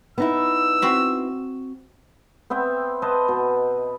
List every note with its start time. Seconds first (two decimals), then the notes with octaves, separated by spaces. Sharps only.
0.18 B3 D#4 E4 E6
0.82 C4 F#4 B5
2.50 B3 C4 E5 G5
3.02 B4 C5 D#5 A5
3.28 B2